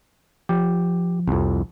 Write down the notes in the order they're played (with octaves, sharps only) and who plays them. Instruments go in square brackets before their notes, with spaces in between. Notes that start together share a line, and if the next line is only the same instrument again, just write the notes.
[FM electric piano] F3 [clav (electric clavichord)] G4
[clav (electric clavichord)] C2 F2